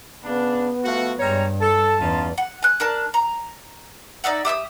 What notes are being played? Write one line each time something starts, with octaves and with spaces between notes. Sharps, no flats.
C#3 B3 D4
F3 A3 F#4
G2 G3 G#3 C#5 A#5
A4 A5
E2 C#4 D#4 F4
F#5
G#5 F#6
D4 A#4 A5
A#5
D#4 D5 E5 F#5
G4 E5 D6 D#6